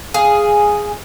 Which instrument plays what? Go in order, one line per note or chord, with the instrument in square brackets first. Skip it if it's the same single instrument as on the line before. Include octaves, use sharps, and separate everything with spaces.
[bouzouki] G#4 F5